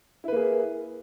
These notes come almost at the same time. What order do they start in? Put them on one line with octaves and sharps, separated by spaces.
E4 B4 A#3 G#4